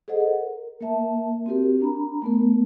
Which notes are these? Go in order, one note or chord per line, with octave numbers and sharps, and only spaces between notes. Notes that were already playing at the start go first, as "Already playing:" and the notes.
G#4 A4 C5 D#5 F#5
A#4
A#3 A#4 E5 A5
C4 F#4 G4 A#4
D4 A#5 B5
A3 B3 A#4